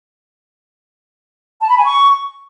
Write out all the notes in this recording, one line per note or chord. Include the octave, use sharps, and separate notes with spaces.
A5
B5
G#5
C#6